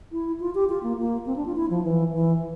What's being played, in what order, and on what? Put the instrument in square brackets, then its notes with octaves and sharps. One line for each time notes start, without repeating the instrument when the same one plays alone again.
[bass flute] E4
F4
G4
F4
A#3
A#3
C4
D4
F4
E4
F3
E3
E3